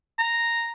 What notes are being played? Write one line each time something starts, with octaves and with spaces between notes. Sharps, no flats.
A#5